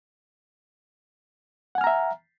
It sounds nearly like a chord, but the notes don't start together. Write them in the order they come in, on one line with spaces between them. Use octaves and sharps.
F#5 G#5 F6 A#5 E5